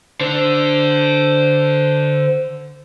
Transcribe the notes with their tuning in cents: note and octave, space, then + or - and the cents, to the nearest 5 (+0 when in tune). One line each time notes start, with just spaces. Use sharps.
D3 +0 C5 -15